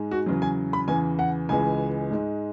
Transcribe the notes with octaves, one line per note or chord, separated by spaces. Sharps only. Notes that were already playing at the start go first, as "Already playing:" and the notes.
Already playing: G#2 G#3
F#4
E2 C#3 F#3
G#5
B5
E2 C#3 E3 G#5
F#5
C#2 C#3 E3 G#3 G#5
G#2 G#3